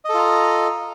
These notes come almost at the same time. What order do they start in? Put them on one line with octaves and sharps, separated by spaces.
D#5 A4 F4 A#5